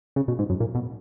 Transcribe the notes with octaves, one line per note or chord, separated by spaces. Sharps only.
C#3
B2
G#2
F#2
A#2
B2